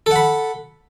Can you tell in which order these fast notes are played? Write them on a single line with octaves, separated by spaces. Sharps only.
A4 F#5 B5